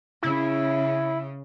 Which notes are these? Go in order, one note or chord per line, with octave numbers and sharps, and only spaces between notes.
C#3 E4